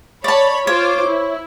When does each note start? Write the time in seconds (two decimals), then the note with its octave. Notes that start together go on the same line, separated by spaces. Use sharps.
0.24 C#5 D5 A5 B5
0.67 F4 C5 C#5 D6
1.06 E4